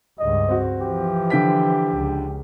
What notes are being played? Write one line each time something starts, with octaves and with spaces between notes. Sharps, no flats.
C#2 G2 D#5
C4 F#4
E3 F3 G4
D3 G5 B6
C#2